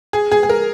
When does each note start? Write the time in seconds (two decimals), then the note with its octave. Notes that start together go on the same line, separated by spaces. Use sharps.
0.13 G#4
0.32 G#4
0.43 G#4
0.49 A#4